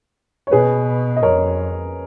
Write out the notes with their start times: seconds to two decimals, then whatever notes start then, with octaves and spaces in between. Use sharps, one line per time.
0.47 C#5
0.51 B2 G#4 B4
1.17 D#5
1.23 F2 A#4 C#5